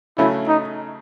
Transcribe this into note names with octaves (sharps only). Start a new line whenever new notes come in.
C#3 F#3 A3 C#4 E4
D#4